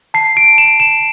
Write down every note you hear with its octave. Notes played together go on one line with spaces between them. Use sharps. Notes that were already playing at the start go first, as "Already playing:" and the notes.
A5 C7
D7
A5 E7
E7